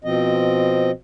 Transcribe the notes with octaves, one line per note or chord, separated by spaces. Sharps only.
B2 F3 C4 D#5